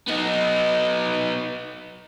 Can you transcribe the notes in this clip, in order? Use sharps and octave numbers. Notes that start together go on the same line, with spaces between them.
B3 D#4